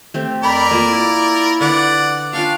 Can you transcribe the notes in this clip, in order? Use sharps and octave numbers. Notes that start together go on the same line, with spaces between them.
A3 C4 G4
F2 A#4 D5 B5
A#3 F4 A4
E4
D3 B4 D5 F#5
C#4 D4 F4 F5 G5 C#6